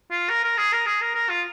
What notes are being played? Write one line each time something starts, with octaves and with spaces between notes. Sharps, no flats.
F4
A#4
A#4
G#4
A#4
G#4
A#4
A#4
F4